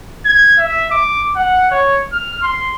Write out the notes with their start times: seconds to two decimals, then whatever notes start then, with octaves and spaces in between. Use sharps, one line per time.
0.25 G#6
0.58 E5
0.91 D6
1.36 F#5
1.71 C#5
2.12 F6
2.42 C6